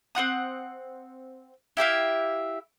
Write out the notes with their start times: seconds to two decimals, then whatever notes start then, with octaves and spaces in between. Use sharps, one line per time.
0.15 C4 F#4 F#5 D#6
1.77 E4 G4 E5 F5